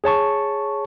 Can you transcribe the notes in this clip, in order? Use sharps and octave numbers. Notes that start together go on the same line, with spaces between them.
G#4 C#5 A5 C#6